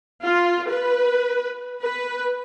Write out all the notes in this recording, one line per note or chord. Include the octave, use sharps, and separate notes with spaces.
F4
B4
B4